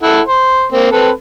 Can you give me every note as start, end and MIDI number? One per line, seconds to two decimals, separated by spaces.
0.03 0.20 64
0.03 0.20 69
0.03 0.20 78
0.27 0.66 72
0.72 0.90 58
0.72 0.90 60
0.92 1.10 60
0.92 1.10 69
0.92 1.10 71